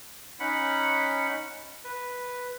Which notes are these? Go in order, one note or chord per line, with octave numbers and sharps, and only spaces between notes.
C#4 D#4 F#5 B5
B4